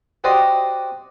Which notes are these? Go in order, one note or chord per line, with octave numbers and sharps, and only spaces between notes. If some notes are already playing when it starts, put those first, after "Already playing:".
F#4 G4 C5 D5 D#5 D#6